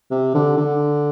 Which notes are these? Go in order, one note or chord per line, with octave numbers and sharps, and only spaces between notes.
C3
D3
D3